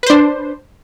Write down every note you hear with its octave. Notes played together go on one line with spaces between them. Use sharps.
D4 B4 C5